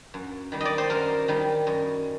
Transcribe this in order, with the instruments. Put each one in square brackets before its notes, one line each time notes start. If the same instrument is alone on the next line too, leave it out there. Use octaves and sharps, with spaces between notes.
[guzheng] F#2
D#3 G3
D5 D#5
C5
F#2 A#4
D#3 G3
F#2